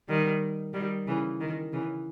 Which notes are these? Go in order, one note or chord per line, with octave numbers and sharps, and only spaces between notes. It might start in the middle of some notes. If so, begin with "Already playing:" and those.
D#3 G3
D#3 G3
C#3 E3
D#3
C#3 E3